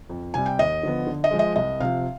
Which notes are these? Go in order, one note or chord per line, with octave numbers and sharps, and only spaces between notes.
F2
C3 G3 G#5
G5
D#2 D#5
D3 F3 B3
D3
D#5
F3 G#3
D#5
C2 D#5
C3 F3 F5